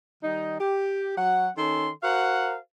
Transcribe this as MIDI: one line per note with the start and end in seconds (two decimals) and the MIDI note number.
0.23 0.59 51
0.23 0.59 55
0.23 0.59 63
0.60 1.14 67
1.18 1.49 54
1.18 1.49 66
1.18 1.49 78
1.57 1.90 51
1.57 1.90 61
1.57 1.90 69
1.57 1.90 84
2.03 2.57 66
2.03 2.57 70
2.03 2.57 72
2.03 2.57 77
2.03 2.57 78